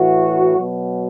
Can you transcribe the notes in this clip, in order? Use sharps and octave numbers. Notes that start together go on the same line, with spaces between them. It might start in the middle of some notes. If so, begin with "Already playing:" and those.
Already playing: A2 E3 F#4
B2 F#3